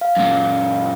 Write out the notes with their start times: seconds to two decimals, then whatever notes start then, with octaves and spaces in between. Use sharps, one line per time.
0.01 F5
0.17 F#2 A#2